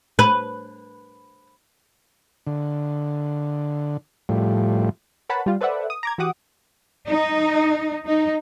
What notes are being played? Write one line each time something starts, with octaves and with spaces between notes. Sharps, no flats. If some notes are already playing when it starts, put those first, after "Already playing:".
B4
D3
A2 F3 G3
A#4 B4 C#5 F#5 A5 B5
G3 F4
A4 B4 C5 D5 E5 F#5
D#6
A#5 D6 G#6
E3 F#4 G4 F#5 D6 D#6
D#4
D#4